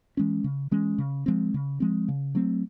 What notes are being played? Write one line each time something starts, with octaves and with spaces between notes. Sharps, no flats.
E3 G#3 C#4
C#3
E3 G#3 C#4
C#3
F3 G#3 C4
C#3
F3 G#3 C4
C#3
F#3 A3 C4